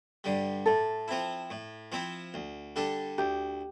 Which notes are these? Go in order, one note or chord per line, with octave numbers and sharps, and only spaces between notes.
G2 D3 G3
A2 A4
F3 C4 E4
A2
F3 C4 E4
D2
D3 G3 D4 A4
D2 G4